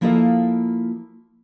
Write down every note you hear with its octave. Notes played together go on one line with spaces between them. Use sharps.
F3 A#3 E4 F4 A4 D#5